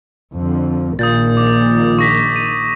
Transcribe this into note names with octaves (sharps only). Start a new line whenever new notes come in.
F2 D3
A#1 A#2 D#3 D#6 G6 A6
D6
C#6 A#6 B6
D#7